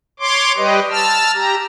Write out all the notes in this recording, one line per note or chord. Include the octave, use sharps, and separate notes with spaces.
C#5 C6 D6
G3 G4 B4 D#5
A5 E6 F6
G4 A#5